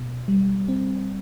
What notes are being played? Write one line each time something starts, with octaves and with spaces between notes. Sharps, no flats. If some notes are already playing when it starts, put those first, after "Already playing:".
Already playing: B2
G3
C4